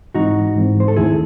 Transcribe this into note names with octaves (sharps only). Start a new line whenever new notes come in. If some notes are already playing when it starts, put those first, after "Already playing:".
G#2 E3 G#3 C4 D#4 F#4
G#2 E3 G#3 C4
C5
A4
D#2 D#3 A3 E4 G#4